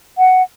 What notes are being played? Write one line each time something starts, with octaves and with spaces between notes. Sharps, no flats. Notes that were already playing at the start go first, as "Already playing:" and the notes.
F#5